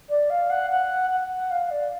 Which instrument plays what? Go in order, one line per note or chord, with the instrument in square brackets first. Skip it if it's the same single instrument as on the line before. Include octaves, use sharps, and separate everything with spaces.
[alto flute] D5
F5
F#5
F#5
F#5
F#5
F5
D5